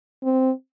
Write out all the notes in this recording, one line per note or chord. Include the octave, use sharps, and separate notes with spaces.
C4